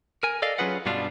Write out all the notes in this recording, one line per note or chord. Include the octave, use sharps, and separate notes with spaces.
A#4 G#5
A4 D5 D#5 F5
F#3 C#4 F4 G#4 B4 F#5
G2 B2 G3 D4 F4